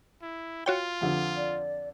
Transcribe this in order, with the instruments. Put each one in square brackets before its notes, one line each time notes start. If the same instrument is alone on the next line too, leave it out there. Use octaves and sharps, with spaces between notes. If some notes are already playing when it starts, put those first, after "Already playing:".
[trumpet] E4
[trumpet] F4 [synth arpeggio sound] F#4 C#5 G5
[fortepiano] F2 D3 F3
[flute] D5